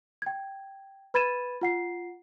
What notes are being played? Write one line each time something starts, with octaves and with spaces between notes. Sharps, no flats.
G5 G#6
B4 B5 G#6 A6 D#7 E7
F4 F#5 C7